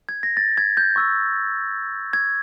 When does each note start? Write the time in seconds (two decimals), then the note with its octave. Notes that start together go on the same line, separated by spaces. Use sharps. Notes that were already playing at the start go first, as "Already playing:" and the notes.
0.09 G#6
0.23 A#6
0.37 A6
0.58 G#6
0.77 G6
0.96 C#6 E6 G6
2.13 G#6